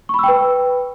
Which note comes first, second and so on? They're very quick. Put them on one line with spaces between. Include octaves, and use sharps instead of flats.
C#6 B5 E6 G5 B4